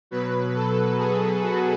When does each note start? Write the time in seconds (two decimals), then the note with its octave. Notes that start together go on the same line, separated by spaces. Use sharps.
0.11 B2 F#3 B4
0.55 A4
0.98 G#4
1.43 F#4